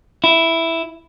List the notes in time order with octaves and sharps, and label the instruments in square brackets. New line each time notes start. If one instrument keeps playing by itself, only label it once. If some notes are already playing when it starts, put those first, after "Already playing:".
[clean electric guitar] E4